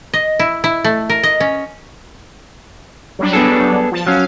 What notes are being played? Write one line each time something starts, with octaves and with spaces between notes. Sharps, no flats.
D#5
E4
E4
A3
A#4
D#5
C#4
F#3 G3 D4
B3 G#4 A4
F3 A5
F#3 C#4 F5